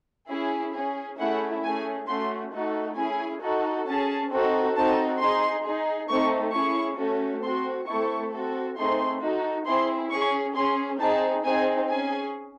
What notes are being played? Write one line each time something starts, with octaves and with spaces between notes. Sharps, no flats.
C#4 E4 G#4
C#4 G#4
A3 C#4 E4 G#4 F#5
A3 C#4 G#4 G#5
A3 C#4 F#4 C6
A3 D#4 F#4 A4
C#4 E4 G#4 G#5
D#4 F#4 A4
C#4 G#4 A5
C4 D#4 F#4 A4
C4 D#4 F#4 A4 A5
D#4 G#4 C6
D#4 G#4
A3 C4 D#4 A4 C#6
C#4 E4 G#4 C#6
A3 C#4 F#4 A4
C4 F#4 A4 C6
A3 C4 E4 A4 C#6
C4 F#4 A4
A3 C4 D#4 G#4 C6
D#4 F#4 A4
C4 E4 G#4 C6
C#4 G#4 C#6
C#4 G#4 C6
C4 D#4 G#4 A5
C4 D#4 G#4 G#5
C#4 G#4 G#5